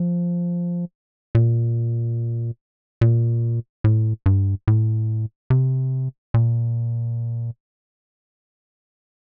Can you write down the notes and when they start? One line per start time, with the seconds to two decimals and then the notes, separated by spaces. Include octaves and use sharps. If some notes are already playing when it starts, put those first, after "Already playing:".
Already playing: F3
1.35 A#2
3.01 A#2
3.84 A2
4.26 G2
4.68 A2
5.50 C3
6.34 A#2